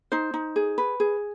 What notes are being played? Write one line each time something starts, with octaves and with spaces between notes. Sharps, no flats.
D#4 C5
D#4
G#4
B4
G#4